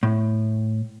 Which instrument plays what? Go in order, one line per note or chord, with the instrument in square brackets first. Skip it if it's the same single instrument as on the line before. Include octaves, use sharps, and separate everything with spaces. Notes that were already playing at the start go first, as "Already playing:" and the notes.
[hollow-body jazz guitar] A2